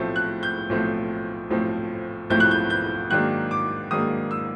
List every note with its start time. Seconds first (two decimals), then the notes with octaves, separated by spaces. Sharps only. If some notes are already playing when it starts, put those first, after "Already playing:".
Already playing: B1 A2 F3 A3 C4
0.16 F#6
0.43 G6
0.69 B1 A2 F3 A3 C4
1.50 B1 A2 F3 A3 C4
2.30 B1 A2 F3 A3 C4 G6
2.40 F#6
2.51 G6
2.70 G6
3.10 G#2 D#3 F#3 A#3 D4 F#6
3.51 D6
3.91 G#2 D#3 F#3 A#3 D4 D#6
4.31 E6